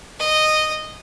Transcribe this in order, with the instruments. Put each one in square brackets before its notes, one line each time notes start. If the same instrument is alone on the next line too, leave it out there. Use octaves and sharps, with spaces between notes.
[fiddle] D#5